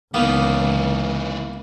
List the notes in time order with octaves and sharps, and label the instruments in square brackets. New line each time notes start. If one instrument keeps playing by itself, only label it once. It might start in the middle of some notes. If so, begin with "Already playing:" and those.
[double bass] C#2 [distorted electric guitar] E3 D#4 [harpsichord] A#3 B3